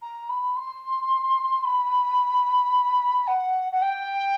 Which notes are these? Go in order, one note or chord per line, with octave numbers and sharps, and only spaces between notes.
A#5
B5
C6
B5
F#5
F#5
G5